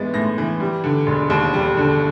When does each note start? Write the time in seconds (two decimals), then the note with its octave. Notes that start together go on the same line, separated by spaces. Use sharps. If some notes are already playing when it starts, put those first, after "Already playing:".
Already playing: A2 E3 G#3 B3 A6
0.14 A2 A#6
0.38 E3
0.60 G3
0.84 D3
1.07 E1
1.30 D#2
1.53 G3
1.77 D3